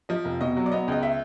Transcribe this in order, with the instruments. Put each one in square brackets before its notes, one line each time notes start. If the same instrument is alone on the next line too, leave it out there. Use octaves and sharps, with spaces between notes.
[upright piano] F3 D#5
F1
B2 D#5
F#3
D5
B3 D#5
C#2 D#5
E5